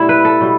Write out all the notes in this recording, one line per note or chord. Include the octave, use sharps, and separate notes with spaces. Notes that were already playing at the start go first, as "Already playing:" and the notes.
Already playing: B2 G3 A3 E4
B4
A4
B2 G3